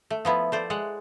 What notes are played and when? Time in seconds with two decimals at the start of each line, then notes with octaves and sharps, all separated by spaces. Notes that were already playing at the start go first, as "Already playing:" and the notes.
0.10 A3
0.25 F3 B3 E4
0.52 A3 C5 D5
0.70 G#3 F#5